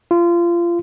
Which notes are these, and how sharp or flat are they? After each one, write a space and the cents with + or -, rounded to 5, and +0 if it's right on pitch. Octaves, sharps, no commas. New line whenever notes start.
F4 -25